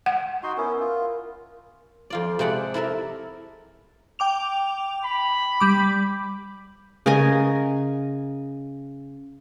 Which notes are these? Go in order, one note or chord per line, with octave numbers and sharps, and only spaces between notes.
F#5
D#4 F#4 C6
B3 C#4 E4 A#4
F4
F2 F4 D5
C3 G#3 D5 F#5 B5
E4 A4 A#4 E5
G5 D6 F7
B5
G3 D6
C#3 A#4 D#5 G#5